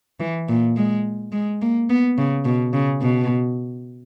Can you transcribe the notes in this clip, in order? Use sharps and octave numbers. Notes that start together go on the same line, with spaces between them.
E3
A#2
G#3
G#3
A#3
B3
C#3
B2
C#3
B2